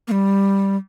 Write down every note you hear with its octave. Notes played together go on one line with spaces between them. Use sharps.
A#3
G3